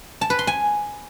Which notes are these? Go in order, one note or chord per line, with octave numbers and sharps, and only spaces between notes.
A5
B4
C6
G#5